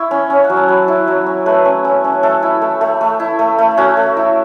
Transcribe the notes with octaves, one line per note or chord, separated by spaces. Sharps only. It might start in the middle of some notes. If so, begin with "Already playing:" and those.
Already playing: E4 C#6
C#4
C#4
F#5
F#3
A5
F#3 B5
E4
F#3
C#4
A3 B4
C#4
C#4
C#4
A3 A4
E4
A3
A3
A3
E4
A3
A3
C#4 F#4
A3
E4